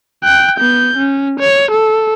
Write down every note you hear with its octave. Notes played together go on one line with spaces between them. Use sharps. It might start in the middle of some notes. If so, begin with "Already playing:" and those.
G5 F#6
B3 G6
C#4
C#5
A4